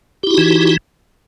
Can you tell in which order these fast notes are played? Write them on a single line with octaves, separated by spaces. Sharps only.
G4 E4 F#4 D#4 E3